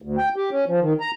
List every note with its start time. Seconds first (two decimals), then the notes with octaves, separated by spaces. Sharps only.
0.02 D2
0.18 G5
0.36 G4
0.51 C#4
0.68 F3
0.81 D#3
1.00 A#5